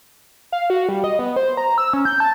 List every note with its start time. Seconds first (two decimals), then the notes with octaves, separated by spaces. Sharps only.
0.52 F5
0.70 F#4
0.89 G3
1.04 D#5
1.19 B3
1.36 C5
1.57 A#5
1.78 E6
1.93 C#4
2.05 G6
2.20 A5